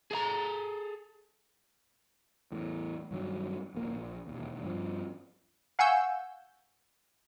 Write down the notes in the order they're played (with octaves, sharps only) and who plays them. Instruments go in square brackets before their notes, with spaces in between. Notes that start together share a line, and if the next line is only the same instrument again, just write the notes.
[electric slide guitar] G#4 A4 E5 A#5
[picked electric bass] E2 A2
G2 D#3 F#3
D1 A#1 A#3
A#1
E1 D#2
G2 F3
[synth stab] F5 F#5 G#5 C#6 E6 G6